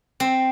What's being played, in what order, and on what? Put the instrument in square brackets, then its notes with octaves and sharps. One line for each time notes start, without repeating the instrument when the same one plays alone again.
[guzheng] C4